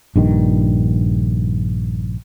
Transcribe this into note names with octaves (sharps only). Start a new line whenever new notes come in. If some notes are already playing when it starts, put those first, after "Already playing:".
A#1 G2 D#3